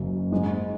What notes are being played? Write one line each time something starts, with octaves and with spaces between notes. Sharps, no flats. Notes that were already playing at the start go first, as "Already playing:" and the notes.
Already playing: F#1 F#2 C#3
G#2 G#3 D#4